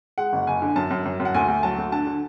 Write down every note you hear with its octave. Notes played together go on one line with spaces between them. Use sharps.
G#3 F#5
F#1
F#1 G#5
D3
F#2 A5
F#2
F#2
F#2
F#5
D2 G#5
D2
F#3 A5
D2
D3 A5
D3